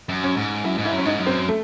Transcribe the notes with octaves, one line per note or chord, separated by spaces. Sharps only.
F#2
C#4
G#2
F#2 E4
G#2
E4
F#2
C#4
G#2 D#4
F#2
C4
A3